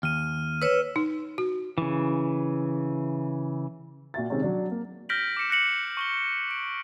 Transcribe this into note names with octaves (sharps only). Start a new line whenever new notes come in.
D#2 F6 D#7
B4 C#5 E6 E7
D#4
F#4
C#3 E3
A#2 F#4 E5 A6
C3 D#3 G#3 C4 C#4
F#3 D4
A#3
F6 G6 A#6 B6 D7 F#7
D6 F6 C#7 E7
F#6 A#6 C#7 F#7
C#6 F#7 G7
D7